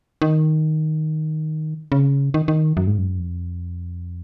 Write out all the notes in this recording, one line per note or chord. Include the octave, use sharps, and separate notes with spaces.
D#3
C#3
D#3
D#3
F#2
G#2
F#2
F2